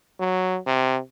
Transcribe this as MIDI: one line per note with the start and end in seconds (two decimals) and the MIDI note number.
0.20 0.58 54
0.66 0.99 48